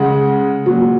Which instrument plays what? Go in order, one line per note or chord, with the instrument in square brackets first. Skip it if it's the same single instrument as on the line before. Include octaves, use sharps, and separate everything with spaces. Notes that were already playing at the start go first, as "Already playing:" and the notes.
Already playing: [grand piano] C#3 G#3 F#5
A#2 F#3